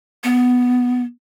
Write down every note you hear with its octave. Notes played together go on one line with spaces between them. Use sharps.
B3